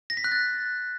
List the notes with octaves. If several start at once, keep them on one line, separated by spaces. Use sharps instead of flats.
A#6
B6
F#6
A6